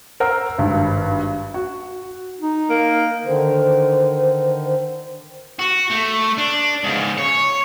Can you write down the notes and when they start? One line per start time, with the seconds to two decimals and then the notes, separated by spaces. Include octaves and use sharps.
0.20 A#4 C5 F#5 A#5 E6
0.58 G#1 G2
1.54 F#4
2.40 D#4
2.70 A#3
3.25 D3 D#3 C5
5.59 F#4
5.90 A3
6.38 D4
6.84 G#2 C#3
7.18 C#5